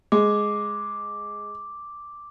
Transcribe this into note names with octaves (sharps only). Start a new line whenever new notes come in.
G#3 D6